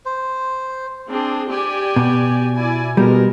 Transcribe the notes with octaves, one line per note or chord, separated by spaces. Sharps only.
C5
C4 D4 G#4
G4 D5 G#5
B2
E4 D5 G#5
B2 G3 G#3 A#4